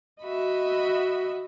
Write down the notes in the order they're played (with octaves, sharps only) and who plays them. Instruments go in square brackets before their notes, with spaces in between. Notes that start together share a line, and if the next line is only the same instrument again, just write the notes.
[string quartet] F#4 D#5 E5 B5